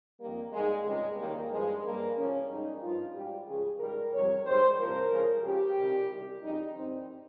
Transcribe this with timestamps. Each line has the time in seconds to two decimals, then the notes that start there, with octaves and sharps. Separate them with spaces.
0.19 F2 D#3 G3 A#3
0.52 G#2 G3 G#3
0.84 C#2 C3 G3 G#3
1.17 D#2 D#3 G3 A#3
1.50 G2 F3 G#3
1.83 G2 G3 A#3
2.16 C2 C3 F3 C#4
2.49 G#2 G3 D#4
2.81 G2 F3 F4
3.14 G#2 G3 G4
3.47 C#2 C#3 F3 G#4
3.79 G#2 D#3 G3 A#4
4.13 F2 C3 D#3 G3 C#5
4.45 G#2 D#3 G3 C5
4.78 C2 A#2 F3 A#4
5.11 C#2 C#3 F3
5.44 C#2 C#3 F3 G4
5.76 C2 C3 D#3 G3
6.09 C2 C3 D#3 G3
6.42 F2 C#3 G3 D#4
6.75 G2 D#3 G3 C4